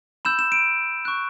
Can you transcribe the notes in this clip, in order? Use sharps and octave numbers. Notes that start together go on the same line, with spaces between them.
B5 E6 G6 E7
E7
D7
C#6 F#6